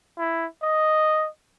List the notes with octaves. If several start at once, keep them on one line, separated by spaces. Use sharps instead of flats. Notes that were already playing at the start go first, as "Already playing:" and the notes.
E4
D#5